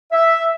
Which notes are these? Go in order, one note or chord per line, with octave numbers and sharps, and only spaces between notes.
E5